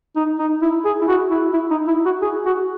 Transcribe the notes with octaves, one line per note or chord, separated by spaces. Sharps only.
D#4
D#4
E4
G#4
E4
F#4
E4
E4
D#4
E4
F#4
G#4
F#4